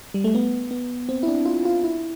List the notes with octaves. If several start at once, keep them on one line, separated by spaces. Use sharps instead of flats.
G3
A3
B3
B3
C4
E4
D4
F4
F4
E4